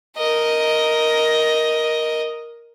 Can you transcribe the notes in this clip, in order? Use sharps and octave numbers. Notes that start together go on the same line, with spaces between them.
A#4 D#5